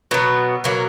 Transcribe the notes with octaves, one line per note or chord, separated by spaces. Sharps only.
B2 F#3 B3
B2 F#3 A#3